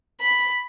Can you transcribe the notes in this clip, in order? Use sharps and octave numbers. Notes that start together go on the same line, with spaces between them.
B5